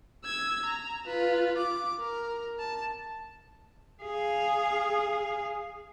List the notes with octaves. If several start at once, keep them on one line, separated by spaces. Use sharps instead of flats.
E6 G#6
A#5
F4 B4
D6
A#4
A5
G#4 F5